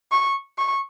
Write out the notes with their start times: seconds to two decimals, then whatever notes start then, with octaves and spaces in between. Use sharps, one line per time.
0.12 C#6
0.58 C#6